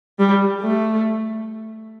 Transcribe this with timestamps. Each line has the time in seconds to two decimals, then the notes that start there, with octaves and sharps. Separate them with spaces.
0.19 G3
0.61 A3